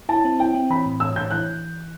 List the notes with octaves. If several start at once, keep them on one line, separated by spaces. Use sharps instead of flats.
E4 A5
C4
E4 G5
C4
E3 B5
A2
A2 E6
A2 G6
E3 F#6